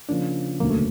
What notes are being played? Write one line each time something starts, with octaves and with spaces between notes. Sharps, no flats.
C#3 F3 A#3 C#4 D4 F4
E1 D2 C#3 F#3 A#3
A3